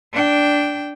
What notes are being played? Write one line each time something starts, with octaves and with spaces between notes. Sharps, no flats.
D4 G5